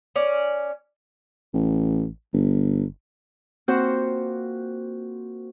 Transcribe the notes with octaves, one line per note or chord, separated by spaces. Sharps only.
C#4 D5
A1
G1
A#3 C4 F4 F#4 C5 F#5